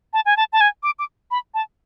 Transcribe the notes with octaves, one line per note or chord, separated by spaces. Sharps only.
A5
G#5
A5
A5
G#5
D6
D6
B5
A5